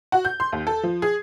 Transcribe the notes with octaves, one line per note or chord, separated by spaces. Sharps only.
F#4
G6
C6
D#2
A4
F3
G#4